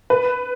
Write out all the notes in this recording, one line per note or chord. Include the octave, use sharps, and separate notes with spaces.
B4